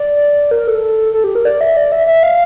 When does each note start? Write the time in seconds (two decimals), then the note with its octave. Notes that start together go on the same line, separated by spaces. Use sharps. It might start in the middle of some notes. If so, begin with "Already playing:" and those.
Already playing: D5
0.51 A#4
0.67 A4
1.14 A4
1.24 G4
1.35 A#4
1.45 D5
1.61 E5
1.77 D5
1.92 E5
2.07 E5
2.23 F5